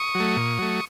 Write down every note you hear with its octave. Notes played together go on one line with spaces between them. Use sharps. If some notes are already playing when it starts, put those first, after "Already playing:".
Already playing: C#6 D#6
F#3
A3
A#2
F#3 A3